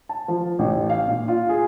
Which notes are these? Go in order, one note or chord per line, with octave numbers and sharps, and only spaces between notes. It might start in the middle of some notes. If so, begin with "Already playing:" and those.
A5
F3
A1
F5
A#2
F4
G#4